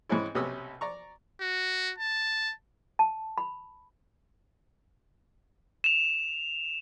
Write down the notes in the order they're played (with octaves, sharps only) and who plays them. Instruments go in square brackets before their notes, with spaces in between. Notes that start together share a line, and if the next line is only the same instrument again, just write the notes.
[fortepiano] G#2 E3 C4 C#4 E4
B1 C3 C#4 B4 D#6 E6
D5 A#5 C#6
[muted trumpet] F#4
A5
[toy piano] A5
B5
[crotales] E7 F7